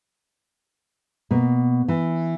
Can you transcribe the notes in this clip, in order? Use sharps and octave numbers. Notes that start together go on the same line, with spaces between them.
B2 A#3
E3